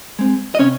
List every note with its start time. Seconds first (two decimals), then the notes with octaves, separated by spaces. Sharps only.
0.19 G#3 C4
0.55 D#5
0.59 C3 C#4 C#5